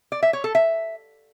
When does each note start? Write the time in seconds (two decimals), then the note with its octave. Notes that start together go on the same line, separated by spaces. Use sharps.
0.12 D5
0.23 E5
0.33 C#5
0.44 A4
0.55 E5